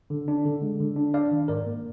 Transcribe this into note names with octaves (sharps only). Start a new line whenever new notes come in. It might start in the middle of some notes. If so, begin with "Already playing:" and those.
D3
D4
D3
G#3
D3
D4
D4 D5 F5
D#3
G#2 A#4 D5
A#3